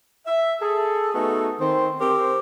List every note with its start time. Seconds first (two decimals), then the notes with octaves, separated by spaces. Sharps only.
0.26 E5
0.61 G#4 A4
1.13 A3 B3 D#4 F#4 G#4 A4
1.59 D#3 C4 C6
2.00 C4 G4 A#4 C5